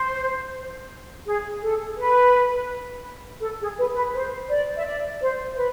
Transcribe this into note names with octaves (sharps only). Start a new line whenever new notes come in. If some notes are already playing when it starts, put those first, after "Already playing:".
Already playing: C5
G#4
A4
B4
A4
G#4
B4
B4
C5
D5
E5
D5
C5
B4